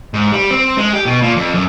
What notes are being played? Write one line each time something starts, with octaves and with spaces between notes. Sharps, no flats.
G#2
G3
C4
G#3
G4
B2
A#2
F2
F#2